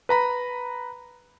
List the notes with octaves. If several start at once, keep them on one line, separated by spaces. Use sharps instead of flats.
B4 A#5 B5